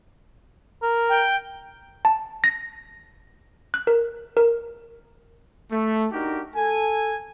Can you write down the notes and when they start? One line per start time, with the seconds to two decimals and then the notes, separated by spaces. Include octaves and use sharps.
0.82 A#4
1.09 G5
2.05 A5
2.44 A#6
3.74 F#6
3.87 A#4
4.37 A#4
5.71 A3
6.12 D4 D#4 F#4 G4 A#4
6.56 A4 G#5